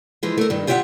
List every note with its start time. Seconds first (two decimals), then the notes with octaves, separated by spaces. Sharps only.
0.23 E3 F3 G#3
0.38 A3 A#4
0.50 G2 D#3
0.67 F4 G4 C5 D5 E5 F#5